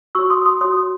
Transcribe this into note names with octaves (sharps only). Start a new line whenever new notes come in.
F#4 C#5 C#6 E6
C6 D#6
C6 D#6
F#4 C#5 C6 D#6